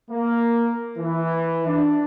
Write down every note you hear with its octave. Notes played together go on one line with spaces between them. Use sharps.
A#3
E3
D4